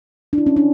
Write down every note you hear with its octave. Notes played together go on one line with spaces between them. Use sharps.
D4
E4
C#4
D4